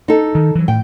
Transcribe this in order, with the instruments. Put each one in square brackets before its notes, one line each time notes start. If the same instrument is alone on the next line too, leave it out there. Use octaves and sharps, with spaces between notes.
[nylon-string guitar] D#4 A4
[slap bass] D#3
E3 F#3
[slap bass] A2 [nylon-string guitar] G5